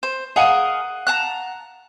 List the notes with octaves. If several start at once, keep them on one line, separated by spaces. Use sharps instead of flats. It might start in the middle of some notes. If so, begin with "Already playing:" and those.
C5
G#4 A#4 D#5 F5 F#5 D#7
A5 A#5 F#6